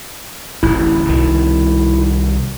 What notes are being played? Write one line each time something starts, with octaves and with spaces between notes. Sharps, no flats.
D1 A1 E4
C2 B2 D#3